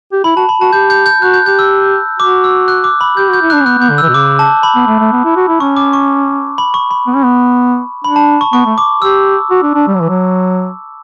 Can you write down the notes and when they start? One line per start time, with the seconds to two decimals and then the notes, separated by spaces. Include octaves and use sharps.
0.12 G4
0.24 E4 B5
0.36 F#4 A5
0.49 B5
0.61 F#4 A5
0.73 G4 G6
0.90 G6
1.06 G6
1.22 F#4 F#6
1.34 G6
1.46 G4 G6
1.59 E6
2.20 F#4 D6
2.44 E6
2.68 F#6
2.84 D6
3.01 B5
3.17 G4 G6
3.29 F#4
3.33 G6
3.42 E4
3.50 F#6
3.53 D4
3.61 C#4
3.66 B3 F#6
3.78 B3 G6
3.90 D3
3.98 E6
4.02 E3
4.09 B2
4.14 C#3 D6
4.39 A5
4.63 B5
4.75 B3
4.87 A3
4.99 A3
5.12 B3
5.24 E4
5.36 F#4
5.48 E4
5.60 C#4 C#6
5.76 D6
5.93 C#6
6.58 B5
6.74 C#6
6.91 B5
7.07 B3
7.16 C#4
7.25 B3
8.04 D4 B5
8.16 A5
8.41 C#6
8.53 B3 C#6
8.66 A3
8.78 D6
9.02 G4 E6
9.50 F#4
9.63 D4
9.75 D4
9.87 G3
9.94 F#3
10.01 E3
10.09 F#3